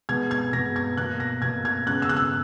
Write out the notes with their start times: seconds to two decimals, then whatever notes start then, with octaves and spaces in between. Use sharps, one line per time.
0.09 B2 G#3 B3 G#6
0.31 G#6
0.53 B2 G#3 B3 A#6
0.76 G#6
0.97 B2 A#3 F#6
1.20 A#6
1.42 B2 A#3 G#6
1.65 G#6
1.86 C#3 G#3 B3 F#6
2.02 E6
2.09 F#6
2.17 E6